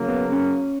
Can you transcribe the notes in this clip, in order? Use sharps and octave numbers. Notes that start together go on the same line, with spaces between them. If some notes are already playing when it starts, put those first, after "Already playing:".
Already playing: C#3 F#3 A#3
B3
C#4